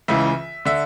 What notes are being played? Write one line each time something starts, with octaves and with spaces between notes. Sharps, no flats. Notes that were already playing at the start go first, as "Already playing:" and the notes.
C#2 C#3 E3 E5
D3 E5